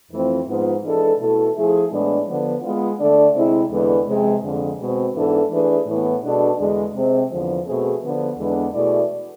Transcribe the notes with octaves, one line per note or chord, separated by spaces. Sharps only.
F2 E3 A3 C4 F4
G#2 F3 B3 F4 B4
E3 G#3 D4 A4
B2 A3 E4 A4
F3 A3 E4 G#4
A2 E3 G#3 B3 D4
D3 F3 B3
G#3 B3 F4
D3 A3 D4 A4 D5
C3 G#3 C4 E4
E2 D3 G#3 B3
C3 F3 G#3 C4 G#4
F2 D3 G#3
B2 G#3 C4
G#2 E3 B3 D4 A4
E3 A3 D4 G#4 B4
A2 E3 B3
B2 G#3 D4 A4
E2 D3 G#3
C3 G#3 C4
E2 D3 F3
B2 A3 C4 G#4
D3 F3 B3
E2 D3 G#3 B3 D4
B2 A3 E4 G#4 D5